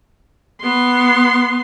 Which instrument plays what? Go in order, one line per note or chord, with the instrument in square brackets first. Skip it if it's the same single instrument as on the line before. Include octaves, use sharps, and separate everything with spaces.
[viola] B3 C6